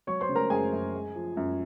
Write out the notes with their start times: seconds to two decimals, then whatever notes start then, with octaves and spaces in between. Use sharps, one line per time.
0.07 F#3 C#5 C#6
0.21 C5 C6
0.29 C#3
0.35 A#4 A#5
0.50 F#2 G#4 G#5
0.72 F#2
0.93 G#3
1.16 F3
1.37 F#2